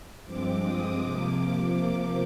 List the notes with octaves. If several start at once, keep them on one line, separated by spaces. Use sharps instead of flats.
G2 F3 G#3 C4 D6
D#6
C3 F3 A#3 D6
D6